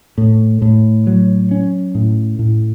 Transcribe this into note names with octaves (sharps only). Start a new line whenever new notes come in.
A2
A2
F#3
C#4
A2
A2